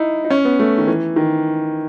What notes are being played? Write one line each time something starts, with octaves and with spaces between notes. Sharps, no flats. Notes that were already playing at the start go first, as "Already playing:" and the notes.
Already playing: D#4 E4
D#4
C#4
B3
A3
D#3
E3
D#3